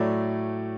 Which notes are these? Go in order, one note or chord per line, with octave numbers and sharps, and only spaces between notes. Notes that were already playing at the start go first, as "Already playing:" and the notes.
Already playing: A2 F#3 A3 D5